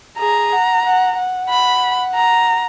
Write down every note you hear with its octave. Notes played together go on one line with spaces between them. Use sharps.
G#4 A#5
F#5
F#5
F#5
B5
A#5